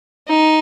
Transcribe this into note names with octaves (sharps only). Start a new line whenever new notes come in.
D#4